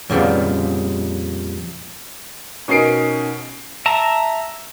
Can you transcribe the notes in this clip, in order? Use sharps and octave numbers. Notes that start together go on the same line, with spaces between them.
F2 A#2 C#3 G3 B3
B2 C#4 D#4 A#4 C7 D7
E5 A5 A#5